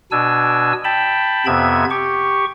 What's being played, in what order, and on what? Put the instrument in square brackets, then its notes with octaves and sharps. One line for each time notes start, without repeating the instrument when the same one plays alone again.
[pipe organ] B2 D4 G#5 E6
G5 A5 B5
F2 C3 B3 E5 G#6
G4 C#6